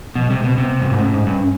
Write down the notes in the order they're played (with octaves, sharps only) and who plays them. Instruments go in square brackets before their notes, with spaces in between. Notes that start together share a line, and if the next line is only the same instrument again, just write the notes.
[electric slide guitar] B2 [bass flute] F3
[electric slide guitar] C3 [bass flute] G3
[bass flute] G#3
[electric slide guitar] B2 [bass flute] C4
[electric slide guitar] C3 [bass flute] B3
[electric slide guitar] G2 [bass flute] C4
[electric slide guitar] G#2
[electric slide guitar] A2 [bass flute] C#4
[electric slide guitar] G#2
G2
[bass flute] C#4